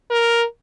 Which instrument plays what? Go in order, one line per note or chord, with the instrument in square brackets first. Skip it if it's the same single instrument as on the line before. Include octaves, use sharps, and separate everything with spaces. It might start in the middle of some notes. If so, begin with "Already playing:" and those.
[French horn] A#4